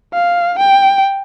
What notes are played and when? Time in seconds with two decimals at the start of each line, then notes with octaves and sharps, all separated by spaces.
0.13 F5
0.59 G5